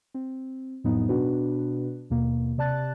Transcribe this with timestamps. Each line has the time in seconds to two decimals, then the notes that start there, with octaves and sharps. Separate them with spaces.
0.14 C4
0.84 F2 A2 F#3 B3 D#4
1.09 B2 B3 D4 F#4 B4
2.10 D#2 B2 A#3
2.58 C3 D5 A5 F#6 A6